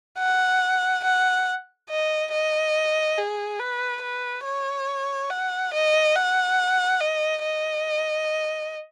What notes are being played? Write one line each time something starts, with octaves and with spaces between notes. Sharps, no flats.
F#5
F#5
D#5
D#5
G#4
B4
B4
C#5
F#5
D#5
F#5
D#5
D#5